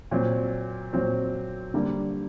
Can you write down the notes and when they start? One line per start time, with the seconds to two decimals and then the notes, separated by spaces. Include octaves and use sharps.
0.11 A#2 F#3 C4
0.93 A#2 F#3 C4
1.74 D3 G3 A#3